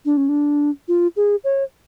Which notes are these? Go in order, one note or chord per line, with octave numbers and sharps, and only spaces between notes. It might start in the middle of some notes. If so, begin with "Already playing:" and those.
D4
C#4
D4
F4
G#4
C#5